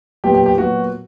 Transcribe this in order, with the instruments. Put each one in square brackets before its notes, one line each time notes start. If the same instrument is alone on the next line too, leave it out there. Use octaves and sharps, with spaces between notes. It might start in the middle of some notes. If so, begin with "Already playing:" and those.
[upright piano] A#2 F#3 B3 G4
G4
G4
A#2 F#3 B3 F#4